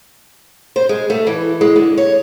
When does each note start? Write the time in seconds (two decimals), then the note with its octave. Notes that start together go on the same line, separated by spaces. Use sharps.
0.76 C5
0.89 G#3
1.10 A3
1.27 E3
1.61 G#3
1.76 D3
1.98 C#5